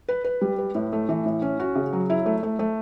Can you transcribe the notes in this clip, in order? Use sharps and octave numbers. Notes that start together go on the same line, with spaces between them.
B4
B4
G3
B4
A2
A3
E3
A2
C#4
F#4
C#3
F#3
E4
A3
A3
A3